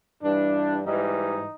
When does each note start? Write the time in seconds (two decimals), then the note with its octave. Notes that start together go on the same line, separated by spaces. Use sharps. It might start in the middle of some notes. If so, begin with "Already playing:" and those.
0.22 G2 E3 G3 D4
0.83 G#2 E3 G3 D#4